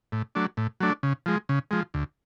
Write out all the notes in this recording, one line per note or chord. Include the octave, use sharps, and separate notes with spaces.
A2
F#3 A3 D4
A2
F#3 A3 D4
C#3
F3 G#3
C#3
F3 G#3
D2